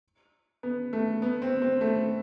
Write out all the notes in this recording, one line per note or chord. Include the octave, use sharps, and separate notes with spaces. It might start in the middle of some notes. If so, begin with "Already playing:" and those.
B3
A3
B3
C4
C4
A3